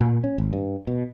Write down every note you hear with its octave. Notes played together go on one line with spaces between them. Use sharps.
A#2
C#4
G#1
G2
B2